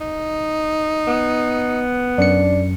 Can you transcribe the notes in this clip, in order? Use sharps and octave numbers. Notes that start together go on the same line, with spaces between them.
D#4
B3
F#2 D4 C#7